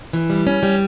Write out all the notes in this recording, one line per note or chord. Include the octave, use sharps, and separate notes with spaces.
E3
G3
C#4
G3